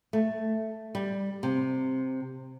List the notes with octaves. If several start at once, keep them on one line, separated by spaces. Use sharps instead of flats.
A3
G3
C3